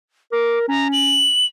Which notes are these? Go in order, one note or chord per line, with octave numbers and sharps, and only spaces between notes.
A#4 D6
C#4 A#5
F#7